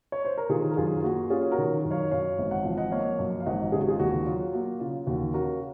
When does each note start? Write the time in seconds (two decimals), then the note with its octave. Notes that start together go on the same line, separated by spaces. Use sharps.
0.12 C#5
0.25 C5
0.38 A#4
0.49 D#3 F4 G#4
0.71 A#4
0.77 F#2 F4 G#4
1.00 F4
1.04 A#3 F#4
1.30 C#4 F4 G#4
1.51 F#4 A#4
1.58 D#3
1.85 F#2
1.91 C#5 F5
2.11 F#2 C#5 F5
2.39 G#1
2.51 F#5
2.65 F3
2.77 D#5 F#5
2.92 A#3 C#5 F5
3.19 F#2
3.40 F5
3.46 G#1 D#5 F#5
3.72 C#3 G#4
3.80 F#4
3.88 F4 G#4
3.99 D#2 F#4
4.26 F#3 F4
4.53 A#3 F#4
4.80 C#3 F4
5.07 D#2 F#4
5.34 C#3 F#4 A#4